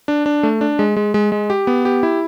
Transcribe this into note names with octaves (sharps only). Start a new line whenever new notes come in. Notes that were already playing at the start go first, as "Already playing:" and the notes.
D4
D4
A3
D4
G#3
G#3
G#3
G#3
G4
B3
G4
E4